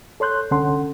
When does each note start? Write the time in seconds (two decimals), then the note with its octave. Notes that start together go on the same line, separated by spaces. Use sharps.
0.20 A4 C#5 C6 F#6 G6
0.51 C2 D3 C#4 A4 F#5 C6